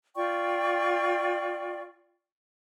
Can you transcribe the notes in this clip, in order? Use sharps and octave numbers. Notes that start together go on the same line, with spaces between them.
F4 D5 G5 C#6